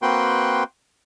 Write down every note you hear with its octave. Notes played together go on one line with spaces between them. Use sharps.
A#3 C4 F#4 B4 G5 C6